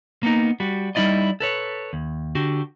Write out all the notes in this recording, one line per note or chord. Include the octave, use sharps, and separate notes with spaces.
A#3 B3 D#4
G3 F#4
G3 D#4 E4 D5 D#5
A4 B4 C#5
D#2
D3 F#4 G4